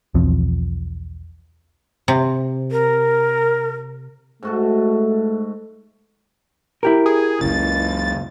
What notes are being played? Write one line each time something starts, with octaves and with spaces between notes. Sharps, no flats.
B1 E2 F3 C4
C3
A#4
G#2 A3 F#4 A4
E4 G4 A#4
G#4
C#2 F#2 C#3 A6